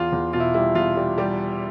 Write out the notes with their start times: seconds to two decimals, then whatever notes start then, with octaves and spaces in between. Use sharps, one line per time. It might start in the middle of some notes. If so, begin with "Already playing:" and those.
Already playing: E2 F4
0.12 E2
0.33 B2 F4
0.40 E4
0.54 G3 E4
0.75 E2 F4
0.97 G3
1.18 G3 G4